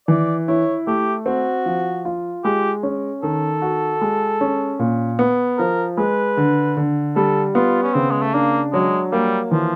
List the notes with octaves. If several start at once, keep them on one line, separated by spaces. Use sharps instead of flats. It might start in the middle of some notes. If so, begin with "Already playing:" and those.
E3 D5
E4 C#5
A3 G4
C4 F#4
F3
F4
G#3 G4
C#4
D#3 A4
F#4
G#3
C#4
A#2
B3
F3 A#4
G#3 B4
D3
D3
G3 A4
B3 F4
C#4
C#3 C4
G#3
A3
A#3 D4
F#3 G#3
G3 A#3
E3 F3